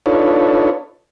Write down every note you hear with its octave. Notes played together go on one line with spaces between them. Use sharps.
D4 D#4 F4 A4 B4 C#5